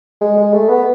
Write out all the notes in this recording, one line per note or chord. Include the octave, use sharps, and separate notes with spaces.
G#3
G#3
A3
B3